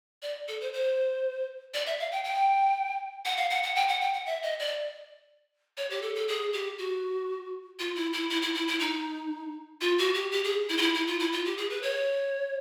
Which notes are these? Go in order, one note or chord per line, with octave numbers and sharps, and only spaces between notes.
D5
A4
C5
C5
D5
E5
F5
G5
G5
F#5
F5
F#5
F#5
G5
F#5
G5
F#5
E5
D#5
D5
C#5
G4
A4
A4
G#4
G4
F#4
F4
E4
E4
E4
E4
E4
E4
D#4
F4
F#4
G4
G4
G#4
E4
F4
E4
E4
F4
E4
F4
G4
G#4
B4
C#5